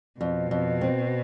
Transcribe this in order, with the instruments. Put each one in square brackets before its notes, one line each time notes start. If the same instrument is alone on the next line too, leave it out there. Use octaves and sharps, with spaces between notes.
[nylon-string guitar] F2 [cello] B2
[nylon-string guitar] F2
C4